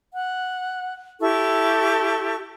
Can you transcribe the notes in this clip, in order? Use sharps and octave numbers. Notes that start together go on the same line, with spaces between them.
F#5
E4 G4 A4 C#6